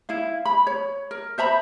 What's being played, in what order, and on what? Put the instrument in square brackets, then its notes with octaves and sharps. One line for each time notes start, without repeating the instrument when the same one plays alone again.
[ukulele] E4 F5
B5
C#5
A#4
C5 E5 A#5 B5